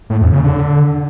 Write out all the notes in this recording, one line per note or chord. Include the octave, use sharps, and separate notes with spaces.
A2
E2
C#3
D3